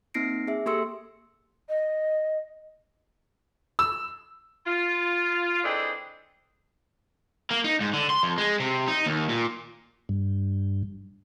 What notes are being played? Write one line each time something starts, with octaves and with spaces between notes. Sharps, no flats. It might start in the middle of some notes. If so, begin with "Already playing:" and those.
A#3 C4 D#4 A#6 C7 D7
G#4 E5
A#3 G4 A4 C6 E6 C#7
D#5
E6
F4
E3 C4 D4 G#4 A4 D#5
A#3
D#4
G#2
D3
C6
F2
G#3
C3
D#4
D#2
A#2
G2